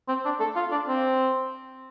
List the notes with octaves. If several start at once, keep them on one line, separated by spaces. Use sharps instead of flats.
C4
D4
A4
F4
D4
C4